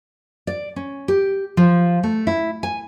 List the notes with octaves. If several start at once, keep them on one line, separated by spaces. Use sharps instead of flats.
D5
C#4
G4
F3
A3
E4
G#5